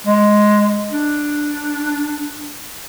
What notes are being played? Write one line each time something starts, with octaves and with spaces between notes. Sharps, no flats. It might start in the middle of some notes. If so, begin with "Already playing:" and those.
G#3
D4